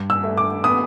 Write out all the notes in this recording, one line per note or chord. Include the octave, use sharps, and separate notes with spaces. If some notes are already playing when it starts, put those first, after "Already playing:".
Already playing: G2
E6
A3
D6
B3 D#6